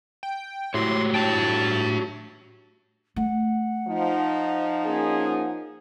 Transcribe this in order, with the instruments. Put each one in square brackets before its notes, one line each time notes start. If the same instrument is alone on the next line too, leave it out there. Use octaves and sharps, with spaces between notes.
[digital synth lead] G5
[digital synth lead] A2 [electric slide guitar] F#4 G4 C#5 [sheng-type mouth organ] C6
[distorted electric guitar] D4 G5 [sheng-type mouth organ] A5
[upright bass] A3 [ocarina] F#5
[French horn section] F3 D#4
[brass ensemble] A#3 C#4 G#4